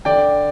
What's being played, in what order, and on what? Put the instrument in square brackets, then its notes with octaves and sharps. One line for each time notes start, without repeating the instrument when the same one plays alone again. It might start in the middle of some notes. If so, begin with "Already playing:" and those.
[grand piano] D3 D5 G5